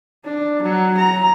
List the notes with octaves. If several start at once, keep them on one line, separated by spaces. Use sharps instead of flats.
D4
F#3
A#5